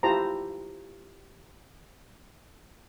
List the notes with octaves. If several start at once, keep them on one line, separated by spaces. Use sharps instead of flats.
E4 F4 G4 C5 A5 A#5